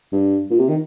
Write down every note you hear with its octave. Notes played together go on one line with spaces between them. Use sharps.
G2
A#2
C3
D#3